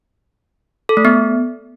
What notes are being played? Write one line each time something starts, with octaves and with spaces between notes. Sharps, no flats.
A4
A3
B3